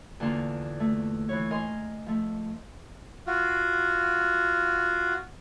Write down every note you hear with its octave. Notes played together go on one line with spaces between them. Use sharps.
E2 D3 A#3 F4
A3
E3 B4 C#5
A#4 D#5 G#5 C6
F3 A3
F4 F#4